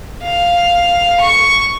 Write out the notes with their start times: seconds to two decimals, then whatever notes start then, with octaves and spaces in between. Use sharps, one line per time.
0.23 F5
1.20 C#6